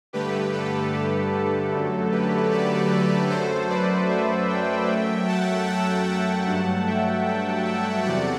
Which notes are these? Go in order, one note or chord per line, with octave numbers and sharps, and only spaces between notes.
G2 D3 A3 G4 B4
A4
G4
A4
F#2 D3 F#3 A3
G4 B4
B4 D5
F#2 F#3 A3 A4 C5
B4 D5
C5 E5
E5 G5
F#2 F#3 A3
F#5 A5
F#5 A5
F#5 A5
G2 F#3 A3 F#5 A5
E5 G5
E5 G5
E5 G5
E2 C3 F#3 A3 D5 F#5